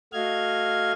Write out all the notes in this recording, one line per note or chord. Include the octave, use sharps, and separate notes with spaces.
A3 F#4 D#5 F5 F6 G#6